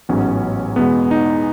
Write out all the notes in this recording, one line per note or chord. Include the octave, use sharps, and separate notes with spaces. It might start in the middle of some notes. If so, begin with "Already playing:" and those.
A1 G#2 F#3 B3 C#4
E2 B2 G#3 B3
D#4